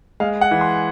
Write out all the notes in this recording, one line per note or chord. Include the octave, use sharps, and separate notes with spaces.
G#3 F5
F#5
E3
C6